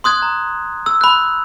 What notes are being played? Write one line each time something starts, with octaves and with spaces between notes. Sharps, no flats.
C6 D#6 F#6 G#6
A#5
E6
B5 F#6